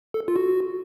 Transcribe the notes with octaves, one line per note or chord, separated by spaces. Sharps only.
A4
F4
F#4